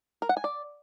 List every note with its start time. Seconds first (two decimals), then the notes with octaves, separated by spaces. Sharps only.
0.22 A#4
0.29 F#5
0.37 G#5
0.44 D5